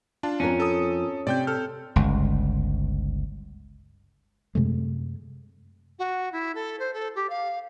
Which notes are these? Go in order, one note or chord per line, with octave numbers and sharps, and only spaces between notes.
D4 F4 A5
F2 C#4 A#4
A4 D#6
C3 D5 G5 G6
A4 F6
G1 C#2
F#2 C3 G#3 A3
F#4
E4
A4
C5
A4
G4
F5